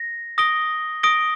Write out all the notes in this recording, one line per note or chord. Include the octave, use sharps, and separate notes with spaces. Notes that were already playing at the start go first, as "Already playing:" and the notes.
Already playing: A#6
D#6 A#6 D7 G7
D#6 A#6 D7 G7